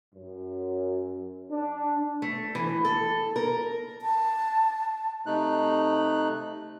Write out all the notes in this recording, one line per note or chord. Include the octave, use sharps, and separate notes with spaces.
F#2
D4
A3
E3
A4
A#4
A5
C3 A3 D#4 F#6